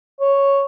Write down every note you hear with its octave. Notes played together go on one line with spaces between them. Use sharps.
C#5